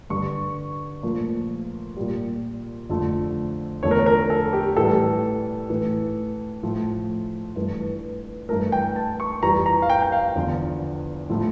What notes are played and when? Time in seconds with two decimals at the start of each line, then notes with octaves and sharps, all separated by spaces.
0.10 G2 D3 G3 C#6
1.03 A#2 F3 A3
1.96 A#2 G3
2.89 F2 D3 F3 A3
3.83 E2 D3 F3 A3 C#5
3.91 A#4
3.98 C#5
4.06 A#4
4.30 A4
4.53 G4
4.77 A2 E3 G3 A4
5.69 A2 E3 A3
6.63 A2 F3 A3
7.56 G2 E3 A3
8.49 G2 E3 A3 A#4
8.72 G5
8.96 A5
9.20 C#6
9.43 F2 E3 G3 A#5
9.66 A#5
9.82 F5
9.90 G5
10.02 G5
10.12 F5
10.35 E2 D3 F3
11.30 A2 F3 A3